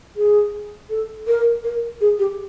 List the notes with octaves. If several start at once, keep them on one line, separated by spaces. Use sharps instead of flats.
G#4
A4
A#4
A#4
G#4
G4